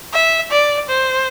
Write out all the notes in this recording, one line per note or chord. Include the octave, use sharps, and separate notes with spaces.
E5
D5
C5